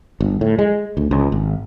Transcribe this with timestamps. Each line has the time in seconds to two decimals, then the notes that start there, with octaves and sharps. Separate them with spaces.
0.21 G1
0.41 A2
0.59 G#3
0.97 D2
1.11 C#2
1.32 G#1